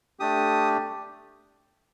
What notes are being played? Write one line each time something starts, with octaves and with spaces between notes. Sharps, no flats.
A3 D4 G4 D#6